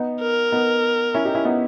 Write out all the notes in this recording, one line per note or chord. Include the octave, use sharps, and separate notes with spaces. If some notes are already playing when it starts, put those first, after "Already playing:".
Already playing: B3 D#4
A#4
B3 D#4
C#4 E4
D#4 G4
C#4 E4
B3 D#4